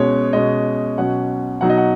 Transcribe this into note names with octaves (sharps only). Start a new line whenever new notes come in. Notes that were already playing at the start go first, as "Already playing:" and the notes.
Already playing: B2 G#3 C#4 C#5
B2 G#3 C#4 D#5
B2 F#3 C#4 F#5
B2 F#3 D#4 F#5
D#5
F#5